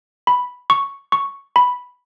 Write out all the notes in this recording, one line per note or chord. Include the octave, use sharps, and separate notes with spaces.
B5
C#6
C#6
B5